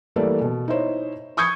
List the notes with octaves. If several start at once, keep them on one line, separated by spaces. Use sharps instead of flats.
E3 G3 A3 A#3 A4 D5
B2
D#4 E4 C5 C#5
C#6 D#6 G6 G#6 C#7